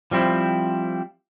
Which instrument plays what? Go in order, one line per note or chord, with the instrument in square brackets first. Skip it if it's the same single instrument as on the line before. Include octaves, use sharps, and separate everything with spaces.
[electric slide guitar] F3 G3 C4 E4